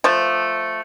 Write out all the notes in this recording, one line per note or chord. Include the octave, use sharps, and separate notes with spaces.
F3 A3